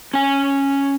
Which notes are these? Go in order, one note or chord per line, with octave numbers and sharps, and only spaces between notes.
C#4 G#5